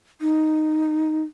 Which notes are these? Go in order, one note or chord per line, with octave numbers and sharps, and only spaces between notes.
D#4